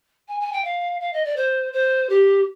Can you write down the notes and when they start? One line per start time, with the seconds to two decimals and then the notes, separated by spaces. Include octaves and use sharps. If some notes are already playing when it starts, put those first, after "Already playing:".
0.28 G#5
0.40 G#5
0.53 G5
0.65 F5
1.00 F5
1.13 D#5
1.25 D5
1.36 C5
1.73 C5
2.09 G4